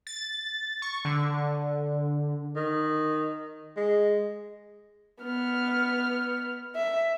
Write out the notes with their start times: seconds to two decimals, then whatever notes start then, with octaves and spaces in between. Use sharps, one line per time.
0.07 A6
0.82 C#6
1.05 D3
2.56 D#3
3.77 G#3
5.22 B3 F6
6.75 E5